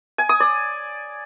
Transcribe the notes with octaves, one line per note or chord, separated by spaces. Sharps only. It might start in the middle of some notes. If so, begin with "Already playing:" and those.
G#5
D#6
D5